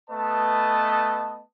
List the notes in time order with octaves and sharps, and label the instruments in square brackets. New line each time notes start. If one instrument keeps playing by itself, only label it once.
[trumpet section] A3 B3 B4 D#5 A5